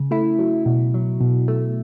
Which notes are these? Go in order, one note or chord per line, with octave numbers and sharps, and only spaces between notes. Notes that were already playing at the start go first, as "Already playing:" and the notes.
Already playing: C#3
A3 E4
F#3
B2
F#3
B2
A3